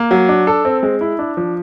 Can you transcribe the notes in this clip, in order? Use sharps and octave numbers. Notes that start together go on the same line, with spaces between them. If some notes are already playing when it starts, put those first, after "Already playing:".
Already playing: A#3
F#3
D4
A4
C4
G#3
E4
D4
F3